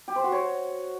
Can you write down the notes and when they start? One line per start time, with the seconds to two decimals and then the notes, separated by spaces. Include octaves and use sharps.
0.08 G4
0.16 C5
0.24 F#4
0.32 C#5